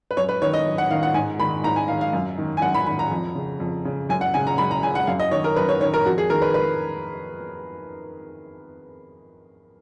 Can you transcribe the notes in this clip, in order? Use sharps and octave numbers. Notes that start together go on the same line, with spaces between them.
B4
F#2 C#5
B4
D#3 C#5
D#5
F#2
F#5
D#3 F5
F#5
G#2 G#5
D#3 B5
G#2 A#5
G#5
D#3 F5
F5
F#2
D#3
G#5
F#2 F#5
B5
D#3 B5
A#5
F2
C#3
F2
C#3
F#2 G#5
F#5
C#3 G#5
A#5
F#2 B5
A#5
C#3 G#5
F#5
F#2 F5
D#5
D#3 C#5
A#4
F#2 B4
C#5
D#3 C#5
A#4
F2 F#4
G#4
D#3 A#4
B4
B4